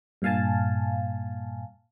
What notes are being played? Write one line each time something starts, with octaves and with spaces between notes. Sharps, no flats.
G2 A#2 F5 G#5 A5